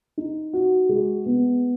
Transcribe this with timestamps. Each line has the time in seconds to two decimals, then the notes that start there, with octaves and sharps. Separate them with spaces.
0.17 D#4
0.53 F#4
0.89 G#3
1.26 B3